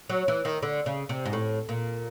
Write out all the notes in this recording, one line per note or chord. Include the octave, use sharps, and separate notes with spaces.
F#3
E3
D#3
D3
C#3
C3
G#2
A2
A#2